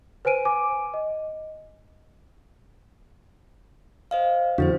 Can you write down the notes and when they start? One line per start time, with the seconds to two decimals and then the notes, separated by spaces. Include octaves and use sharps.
0.25 B4 C5 G#5 D7 D#7
0.45 G#5 D6
0.94 D#5
4.11 C5 D#5 F5
4.58 F2 D3 D4 E4 F#4 C5